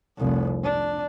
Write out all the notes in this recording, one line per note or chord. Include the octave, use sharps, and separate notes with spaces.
F1 C2
D4